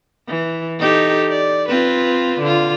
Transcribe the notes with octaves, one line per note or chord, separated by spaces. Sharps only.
E3
D#4 G4 A4
D5
C4 F4 B4
D3 F4